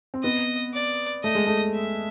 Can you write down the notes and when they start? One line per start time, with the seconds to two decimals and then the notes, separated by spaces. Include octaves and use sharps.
0.14 C4
0.24 B3 D#5
0.73 D5
1.23 A3 D#5
1.35 G#3
1.47 A3
1.74 E5